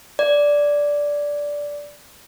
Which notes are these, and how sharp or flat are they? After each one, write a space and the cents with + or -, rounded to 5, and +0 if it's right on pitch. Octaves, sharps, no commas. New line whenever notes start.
D5 -10